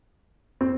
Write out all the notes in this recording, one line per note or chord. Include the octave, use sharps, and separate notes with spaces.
C4